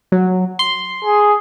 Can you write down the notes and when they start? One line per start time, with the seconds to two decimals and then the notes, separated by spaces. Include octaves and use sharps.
0.12 F#3
0.59 C6
1.05 G#4